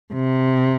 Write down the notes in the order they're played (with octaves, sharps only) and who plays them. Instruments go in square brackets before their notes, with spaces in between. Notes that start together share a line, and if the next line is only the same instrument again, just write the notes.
[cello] C3